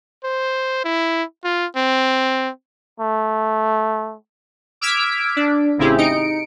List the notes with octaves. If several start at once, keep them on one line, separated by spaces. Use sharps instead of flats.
C5
E4
F4
C4
A3
D6 E6 F6 G#6 B6 D7
D4
A1 C#3 C4 E4 G4 G#4
D#4 C#7 D7